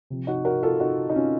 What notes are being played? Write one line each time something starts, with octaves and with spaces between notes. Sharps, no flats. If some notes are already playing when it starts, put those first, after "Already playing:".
C3 F3
D#4 F#4
F#4 A#4
F4 A4
D#4 F#4
D#4
C#4 F4